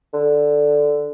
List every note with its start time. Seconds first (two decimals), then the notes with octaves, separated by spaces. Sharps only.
0.14 D3